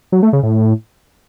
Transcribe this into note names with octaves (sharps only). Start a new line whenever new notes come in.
F#3
A3
C#3
A2